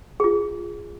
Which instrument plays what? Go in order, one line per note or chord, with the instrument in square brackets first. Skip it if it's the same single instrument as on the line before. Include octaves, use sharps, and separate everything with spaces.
[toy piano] F4 G#4